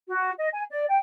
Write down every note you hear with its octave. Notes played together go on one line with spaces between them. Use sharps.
F#4
D#5
G#5
D5
G5